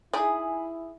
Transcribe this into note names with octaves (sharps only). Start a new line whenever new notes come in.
D#4 E4 G#4 D5 E5 G#5 B5 D#6